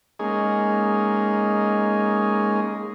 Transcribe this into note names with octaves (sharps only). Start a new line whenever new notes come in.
G#3 A#3 C#4 D#4 G#4